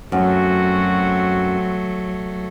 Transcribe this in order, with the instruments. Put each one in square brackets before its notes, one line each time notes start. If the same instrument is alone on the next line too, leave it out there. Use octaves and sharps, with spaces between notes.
[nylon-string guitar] F#2 [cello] F#3 A3 [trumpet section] C4 F#4